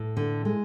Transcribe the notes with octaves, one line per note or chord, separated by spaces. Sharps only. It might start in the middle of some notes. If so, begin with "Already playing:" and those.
Already playing: A2
D3
G#3